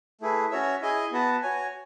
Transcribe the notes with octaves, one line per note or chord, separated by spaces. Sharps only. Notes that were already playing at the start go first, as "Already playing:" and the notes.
A3 E4 G#4 B4
C#4 F#4 C#5 E5
E4 G#4 D#5 G#5
B3 F#4 B4 F#5 A5
F#4 C#5 G#5